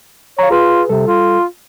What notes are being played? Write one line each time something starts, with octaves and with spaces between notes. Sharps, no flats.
C#5 F5 A#5
F4 G#4 B4
C3 G3 A4
F4